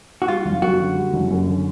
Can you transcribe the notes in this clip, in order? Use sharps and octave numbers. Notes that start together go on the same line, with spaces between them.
F#4
G3 F4
F#1
F#2 F#4
D3
G3
F#1
F#2
D3